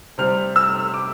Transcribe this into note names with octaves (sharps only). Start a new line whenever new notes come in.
C3 G3 C4 F6
E6
D6